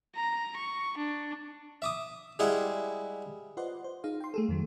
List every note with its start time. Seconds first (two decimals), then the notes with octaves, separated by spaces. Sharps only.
0.16 A#5
0.57 C#6
0.98 D4
1.82 E5 D6 D#6
2.39 G3 G#3 E4 G#4 F#5 G5
3.57 F4 B4 C5 D5 D#5 F#5
3.84 C5
4.04 D#4 G#4 F5
4.20 G5 C6
4.34 A3 G#4 A4
4.48 F2 D#3 F#3